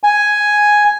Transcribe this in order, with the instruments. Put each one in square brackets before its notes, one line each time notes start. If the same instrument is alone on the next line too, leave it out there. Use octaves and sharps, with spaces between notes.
[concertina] G#5